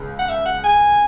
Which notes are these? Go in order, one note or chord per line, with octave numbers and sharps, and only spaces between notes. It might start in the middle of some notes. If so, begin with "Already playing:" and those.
Already playing: C#2 C#3
F#5
E5
F#5
G#5